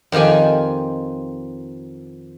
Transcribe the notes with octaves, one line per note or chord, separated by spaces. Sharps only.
F2 D#3 F3 G4 G#5